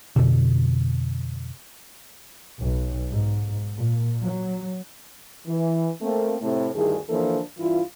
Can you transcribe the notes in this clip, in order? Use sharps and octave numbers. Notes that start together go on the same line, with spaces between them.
F2 B2 D3
B1
G#2
A#2
F#3
E3
A3 A#3 C4
A2 C3 A3
D2 G2 D#3 E4 G#4
D3 E3 F3 A#3 D4 A4
G2 E3 E4 F4